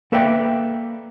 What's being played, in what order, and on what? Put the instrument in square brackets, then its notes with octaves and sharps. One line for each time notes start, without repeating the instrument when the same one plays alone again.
[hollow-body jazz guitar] A#3 A4 B4 D5 E5 G5